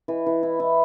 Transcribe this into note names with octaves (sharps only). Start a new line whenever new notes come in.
E3
E3
E4
E4